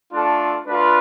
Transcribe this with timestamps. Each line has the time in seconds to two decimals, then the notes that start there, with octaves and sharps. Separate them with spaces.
0.13 A3 D4 F4 A4
0.66 A3 D4 F4 B4